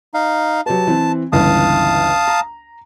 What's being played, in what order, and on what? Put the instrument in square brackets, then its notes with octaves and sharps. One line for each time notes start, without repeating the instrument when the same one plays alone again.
[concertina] D#4 F5
[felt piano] F#3 G4 B4 [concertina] A5
[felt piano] E3 C4
[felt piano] G1 C#2 E3 [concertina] F5 A5 D#6
[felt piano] A#5